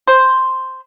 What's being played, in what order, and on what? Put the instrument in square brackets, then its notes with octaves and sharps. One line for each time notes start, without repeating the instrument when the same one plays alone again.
[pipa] C5